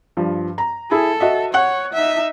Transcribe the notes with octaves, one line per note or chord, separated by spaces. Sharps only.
G2 F3
A#5
E4 G#4 A4
F#4 D#5 E5
C#5 F#5 F#6
D#4 E5